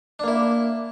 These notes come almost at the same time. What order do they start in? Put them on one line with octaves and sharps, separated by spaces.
D4 A#3 E4